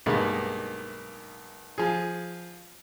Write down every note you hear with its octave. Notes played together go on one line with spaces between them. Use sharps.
B1 G2 D#3 G#3 A#3
F3 G#4